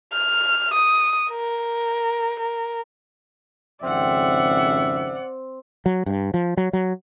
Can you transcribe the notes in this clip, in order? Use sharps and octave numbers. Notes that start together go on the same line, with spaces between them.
F6
D#6
A#4
A#4
G#1 F2 C#3 C4 D5 E5 F#5
F#3
G2
F3
F#3
F#3